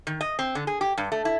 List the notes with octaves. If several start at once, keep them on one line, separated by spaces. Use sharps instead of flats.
D#3
D#5
C4
D3
G#4
G4
G2
A3
E4